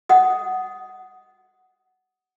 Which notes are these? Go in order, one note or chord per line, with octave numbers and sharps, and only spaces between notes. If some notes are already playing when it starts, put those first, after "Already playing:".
D#5 F#5 D#6